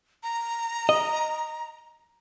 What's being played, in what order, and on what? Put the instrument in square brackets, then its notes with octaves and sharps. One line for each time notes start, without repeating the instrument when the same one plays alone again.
[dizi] A#5
[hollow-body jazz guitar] D#5